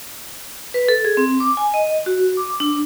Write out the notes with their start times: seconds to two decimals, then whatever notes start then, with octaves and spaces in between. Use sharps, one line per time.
0.74 B4
0.88 A4
1.05 G#4
1.17 C4
1.40 D6
1.57 G#5
1.74 D#5
2.06 F#4
2.37 D6
2.60 D4